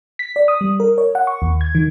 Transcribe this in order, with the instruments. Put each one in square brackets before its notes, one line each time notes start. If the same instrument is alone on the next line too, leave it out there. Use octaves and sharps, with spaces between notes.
[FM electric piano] B6
D5
D#6
G3
A#4
C#5
F#5
C#6
D#2
G#6
D#3